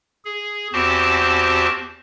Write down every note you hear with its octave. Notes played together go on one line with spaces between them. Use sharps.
G#4
E2 C4 F#4 G4 C5 A5